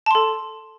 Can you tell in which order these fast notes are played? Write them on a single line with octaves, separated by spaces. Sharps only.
A5 C6 A4